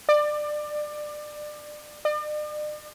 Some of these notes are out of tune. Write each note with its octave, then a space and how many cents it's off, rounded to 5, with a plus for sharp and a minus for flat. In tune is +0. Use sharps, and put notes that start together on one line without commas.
D5 +25
D5 +45